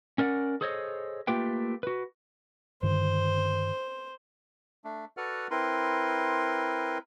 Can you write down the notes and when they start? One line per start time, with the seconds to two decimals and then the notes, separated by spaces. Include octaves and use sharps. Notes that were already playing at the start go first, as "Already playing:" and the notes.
0.18 C#4 A#4 D5 F#5
0.61 G#4 A4 C5 C#5 D#5
1.27 A3 A#3 F4 G4 B4 G5
1.83 F#4 B4
2.83 G2 D3 D#3 C5
4.84 A3 D4
5.17 F#4 A4 B4 D5 F#5 F6
5.51 C4 E4 A#4 B4 C6